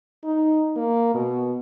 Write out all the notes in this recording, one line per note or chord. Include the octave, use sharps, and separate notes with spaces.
D#4
A#3
B2